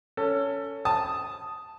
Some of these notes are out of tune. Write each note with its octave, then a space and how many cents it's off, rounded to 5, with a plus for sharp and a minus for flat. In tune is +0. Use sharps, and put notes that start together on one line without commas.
C#4 +15 A4 +25
A5 +0 D#6 +0